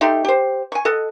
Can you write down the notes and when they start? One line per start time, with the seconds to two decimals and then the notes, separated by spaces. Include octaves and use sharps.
0.01 A3 D#4 G4 C6
0.25 G4 C5
0.72 G#5 C#6
0.85 A4 D#5 F#5